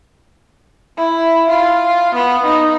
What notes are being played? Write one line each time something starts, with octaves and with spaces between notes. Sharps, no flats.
E4
F4
B3
D#4